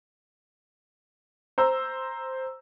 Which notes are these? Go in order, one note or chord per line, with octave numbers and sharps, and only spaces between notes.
C5 A#5 E6